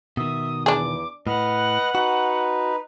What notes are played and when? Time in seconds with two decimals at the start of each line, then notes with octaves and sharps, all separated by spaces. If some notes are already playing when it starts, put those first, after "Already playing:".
0.17 B2 D#3 E5 D#6
0.66 E2 D4 G#4 D6
1.27 A2 B4 D#5 F#5 F6
1.95 D#4 F#4 B4